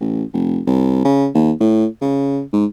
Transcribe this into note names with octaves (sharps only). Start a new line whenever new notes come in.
A1
F1
C2
C#3
D#2
A2
C#3
G#2